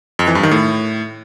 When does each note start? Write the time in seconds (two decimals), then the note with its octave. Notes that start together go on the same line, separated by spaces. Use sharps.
0.19 F2
0.27 E3
0.35 G2
0.43 D#3
0.51 A2